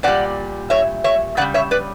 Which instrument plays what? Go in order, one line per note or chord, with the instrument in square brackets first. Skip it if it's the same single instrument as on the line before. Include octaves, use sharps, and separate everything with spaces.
[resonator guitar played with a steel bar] A#2 G3 D5 F#5
C#5 E5
C#5 E5
C#3 D5 F#5
G3
C#5 E5
B4 D5